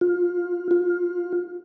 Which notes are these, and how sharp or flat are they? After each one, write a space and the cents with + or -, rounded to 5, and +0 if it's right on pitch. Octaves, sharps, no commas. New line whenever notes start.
F4 +20
F4 +20